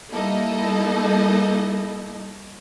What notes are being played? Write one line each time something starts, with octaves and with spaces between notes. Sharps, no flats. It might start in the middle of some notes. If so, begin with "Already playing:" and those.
G3 A#3 D#4 E4 A4 D#5